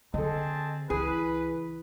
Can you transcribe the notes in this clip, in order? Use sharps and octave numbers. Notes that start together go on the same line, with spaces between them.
D3 C4 G#4 A4 D#5 A5
C#2 E3 G#4 B4